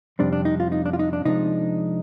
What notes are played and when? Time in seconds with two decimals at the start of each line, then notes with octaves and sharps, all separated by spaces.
0.19 F2 C3 G3 C4 D4
0.33 D4
0.45 D#4
0.60 F4
0.72 D#4
0.86 D4
0.93 F4
0.99 D#4
1.13 D4
1.25 C3 F3 G#3 D4 D#4